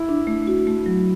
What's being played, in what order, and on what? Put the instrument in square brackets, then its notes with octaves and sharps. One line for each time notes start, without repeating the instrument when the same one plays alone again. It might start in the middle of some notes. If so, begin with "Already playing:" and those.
Already playing: [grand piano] E4
[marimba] D4
A3
F#4
A3
F#3